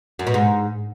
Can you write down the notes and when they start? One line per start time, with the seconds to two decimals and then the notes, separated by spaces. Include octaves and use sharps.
0.19 F#2
0.27 B2
0.34 G#2